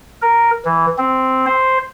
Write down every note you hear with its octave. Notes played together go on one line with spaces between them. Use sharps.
A#4
E3
C4
C5